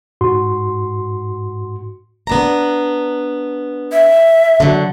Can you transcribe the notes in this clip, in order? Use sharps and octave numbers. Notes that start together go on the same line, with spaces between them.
G#2 F#4 C6
B3 D4 A#5
E5
D3 F#3